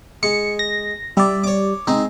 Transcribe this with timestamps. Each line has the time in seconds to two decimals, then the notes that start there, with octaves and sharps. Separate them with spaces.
0.23 G#3 C#7
0.59 A#6
1.17 G3 E4 D5
1.44 C#5 D6
1.87 G#3 C4 D#4